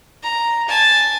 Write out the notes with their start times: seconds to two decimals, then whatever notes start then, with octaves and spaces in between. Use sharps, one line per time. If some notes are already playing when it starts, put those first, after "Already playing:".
0.23 A#5
0.68 G#5 A5